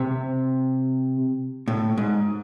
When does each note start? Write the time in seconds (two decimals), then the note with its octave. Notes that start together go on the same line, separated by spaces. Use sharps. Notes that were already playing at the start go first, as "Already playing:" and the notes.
Already playing: C3
1.68 A2
1.98 G#2